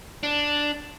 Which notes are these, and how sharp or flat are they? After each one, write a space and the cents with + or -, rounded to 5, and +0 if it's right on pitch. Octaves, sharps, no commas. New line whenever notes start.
D4 +0